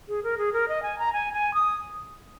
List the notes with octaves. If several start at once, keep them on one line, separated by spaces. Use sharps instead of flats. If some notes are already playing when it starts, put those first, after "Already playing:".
G#4
A#4
G#4
A#4
D#5
G#5
A#5
G#5
G#5
D#6